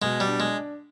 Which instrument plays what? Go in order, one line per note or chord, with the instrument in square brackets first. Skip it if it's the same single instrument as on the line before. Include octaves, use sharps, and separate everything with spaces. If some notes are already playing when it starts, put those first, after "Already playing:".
[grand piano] B2 [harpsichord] G#3
[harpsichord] G3
[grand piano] D4
[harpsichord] G#3